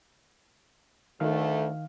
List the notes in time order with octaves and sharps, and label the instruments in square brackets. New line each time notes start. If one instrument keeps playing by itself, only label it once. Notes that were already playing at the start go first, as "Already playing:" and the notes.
[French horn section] D2 A3 [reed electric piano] D#3 F5 F6